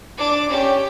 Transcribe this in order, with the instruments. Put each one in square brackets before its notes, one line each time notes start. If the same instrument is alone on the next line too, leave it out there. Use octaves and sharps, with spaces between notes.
[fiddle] D4 D6
[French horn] C#4 [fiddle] G4